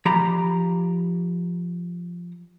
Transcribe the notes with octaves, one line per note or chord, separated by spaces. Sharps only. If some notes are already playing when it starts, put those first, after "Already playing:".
F3 G4 A#5 B5